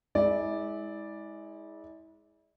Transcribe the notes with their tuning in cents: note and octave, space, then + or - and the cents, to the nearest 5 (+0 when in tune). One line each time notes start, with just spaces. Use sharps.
G#3 +0 E4 -35 D5 +0